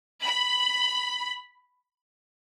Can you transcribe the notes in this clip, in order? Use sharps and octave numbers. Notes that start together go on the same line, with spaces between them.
B5